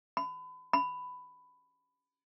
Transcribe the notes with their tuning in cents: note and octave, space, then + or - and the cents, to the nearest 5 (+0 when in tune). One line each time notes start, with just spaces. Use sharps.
B5 +35
B5 +15